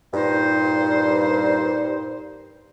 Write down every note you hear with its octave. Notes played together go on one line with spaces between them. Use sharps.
G2 A#2 D#4 C5